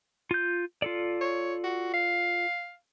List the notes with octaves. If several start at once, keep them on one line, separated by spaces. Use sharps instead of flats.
F4 G6
F4 A4 D5
C#5
F#4
F5